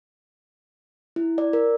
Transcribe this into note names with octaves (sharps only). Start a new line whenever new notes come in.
E4
D5
A#4